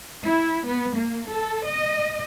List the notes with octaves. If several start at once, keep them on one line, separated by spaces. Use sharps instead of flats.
E4
B3
A#3
A4
D#5